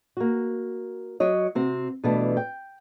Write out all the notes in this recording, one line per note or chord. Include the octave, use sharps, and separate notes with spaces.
A#3 F#4
F#3 C#5 D#5
C3 C4 F#4
B2 E3 G3 A3 D4
G5